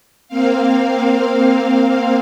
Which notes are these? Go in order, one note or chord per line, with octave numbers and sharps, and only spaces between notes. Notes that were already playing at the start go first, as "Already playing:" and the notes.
A#3 C4 F5